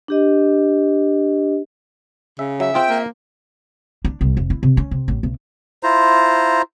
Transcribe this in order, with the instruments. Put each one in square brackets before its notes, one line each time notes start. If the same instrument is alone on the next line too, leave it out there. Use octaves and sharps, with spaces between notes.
[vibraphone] D4 G4 D#5
[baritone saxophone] C#3 [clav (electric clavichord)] E5
[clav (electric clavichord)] F#3 [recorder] E5
[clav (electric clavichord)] C4 F4 G#4 [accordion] G5
[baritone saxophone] A#3
[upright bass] D4
C2
F1
E4
C3
C#4
C3
A1
B1
[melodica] E4 F4 C5 A#5